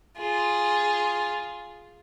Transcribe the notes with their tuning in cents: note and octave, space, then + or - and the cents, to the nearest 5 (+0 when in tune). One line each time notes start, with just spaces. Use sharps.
F4 +0 G#4 +0